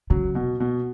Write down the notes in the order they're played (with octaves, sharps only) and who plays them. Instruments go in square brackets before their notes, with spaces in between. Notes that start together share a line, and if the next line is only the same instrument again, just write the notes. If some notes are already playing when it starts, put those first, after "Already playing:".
[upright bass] C#3 [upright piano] F#3
[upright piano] B2
B2